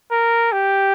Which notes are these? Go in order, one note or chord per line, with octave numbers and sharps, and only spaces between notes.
A#4
G4